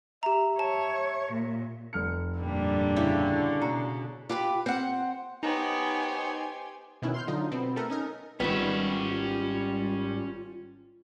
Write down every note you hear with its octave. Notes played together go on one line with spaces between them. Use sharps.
G4 E5 A#5
C#5 A5
A#2
F1 F6 C#7
G2 A#2 D3 G3
C#3 E4 G4
B2 F#4 A#5
F4 G4 B4 B5
C4 C5 F#5
B3 D#4 G4 C5 C#5 G#5
B2 D#3 B3 C#4 E4
C6 F6 G6
D3 F#3 D#4 F4
B2 B3 C4
A3 B3 A4 A#4
C#4 D#4 A#4
G#1 D#3 G3 B3 C#4 F4 E5